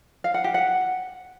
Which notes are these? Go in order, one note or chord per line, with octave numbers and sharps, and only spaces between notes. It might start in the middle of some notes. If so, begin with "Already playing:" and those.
F5
F#5
G4
F#5